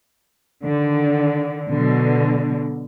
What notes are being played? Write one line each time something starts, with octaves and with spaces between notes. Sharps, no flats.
D3 D#3
B2 D3 F#3